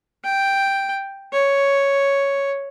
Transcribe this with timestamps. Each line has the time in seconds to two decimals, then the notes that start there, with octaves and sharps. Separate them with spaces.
0.25 G5
1.33 C#5